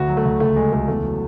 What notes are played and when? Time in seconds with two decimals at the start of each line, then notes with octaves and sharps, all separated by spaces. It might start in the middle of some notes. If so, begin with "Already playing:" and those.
Already playing: D2 F#4
0.08 F#3
0.17 A3
0.25 D2
0.40 C#2 A3
0.56 F#3 G#3
0.73 C#2 A3
0.88 E2 A3
1.05 F#3